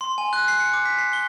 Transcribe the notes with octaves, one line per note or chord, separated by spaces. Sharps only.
C6
G#5
F#6
C7
C#7
D6
B6
C7
G7